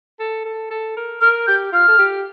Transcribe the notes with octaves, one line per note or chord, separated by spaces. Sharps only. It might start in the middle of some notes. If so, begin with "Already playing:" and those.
A4
A4
A4
A#4
A#4 F6
G4 G6
F4 F6
A4
G4